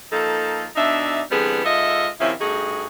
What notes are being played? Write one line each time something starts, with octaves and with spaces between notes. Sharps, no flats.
F3 A#3 D#4 A4
B2 D4 D#4 D5 E5
D3 E3 G3 B3 C4 G#4
G#2 F4 A4 D#5 E5
C3 D#3 F3 C#4 E4
G2 A3 D#4 F#4 G#4